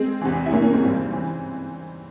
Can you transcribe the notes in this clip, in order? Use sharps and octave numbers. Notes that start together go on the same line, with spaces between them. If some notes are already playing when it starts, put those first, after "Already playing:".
Already playing: G#3 C4
E2 C3 E3
E4
C2 C3 E3 A#3 C#4
A#3 C#4
G#3 C4
G#1 G2 E3
C#3 E3